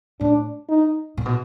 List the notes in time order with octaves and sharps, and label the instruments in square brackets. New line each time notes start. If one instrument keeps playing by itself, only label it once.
[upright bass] A2 [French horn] D4
[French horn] D#4
[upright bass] A#2
B2